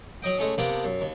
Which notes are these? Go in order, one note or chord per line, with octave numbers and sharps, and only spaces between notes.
F#3 D#5 G5
G#3 A3 C#4
C3 A#3 B3 D4 G4
F#2
D#2